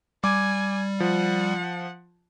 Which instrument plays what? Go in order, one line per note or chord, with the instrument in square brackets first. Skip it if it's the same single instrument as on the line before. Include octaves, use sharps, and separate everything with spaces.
[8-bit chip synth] G3 [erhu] G#5 [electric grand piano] D6
[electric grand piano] F3 [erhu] F#5